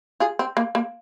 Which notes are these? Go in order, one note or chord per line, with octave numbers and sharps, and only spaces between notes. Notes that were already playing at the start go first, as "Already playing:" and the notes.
F4 G#4
C4
A#3
A#3